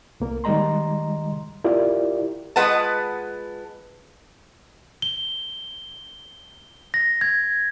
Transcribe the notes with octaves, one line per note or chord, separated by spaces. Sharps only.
C2 A#3 A#4
D#3 G3 G#3 D#5 A#5 C6
E4 F4 G4 A#4 D5
G#3 F4 B4 F#5 A5
G7
A#6
G#6